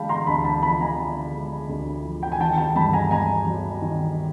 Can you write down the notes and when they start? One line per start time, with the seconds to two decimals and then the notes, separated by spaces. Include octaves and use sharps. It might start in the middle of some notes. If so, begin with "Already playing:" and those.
Already playing: D3 G#3 F5 G5 A5 B5
0.09 A#5 C6
0.27 D2 A5 B5
0.45 A5 B5
0.62 F3 A5 B5
0.81 G#5 A#5
0.99 D3
1.34 G#3
1.69 D2
2.04 F3
2.23 G5
2.32 G#5
2.40 D#3 G5 A5
2.58 G5 A5
2.76 G2 A5 B5
2.93 G#5 A#5
3.11 G2 G#5 A#5
3.47 F#3
3.82 D#3